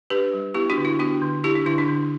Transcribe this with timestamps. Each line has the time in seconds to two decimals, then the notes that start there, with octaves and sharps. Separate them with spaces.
0.10 D4 G4 B4
0.33 G3
0.54 B3 E4 G4
0.70 D4 F#4
0.77 D3
0.85 E4
0.99 B3 D4 F#4
1.22 D3
1.44 D4 E4 G4
1.56 D4
1.66 D3 E4
1.78 D4
1.88 D3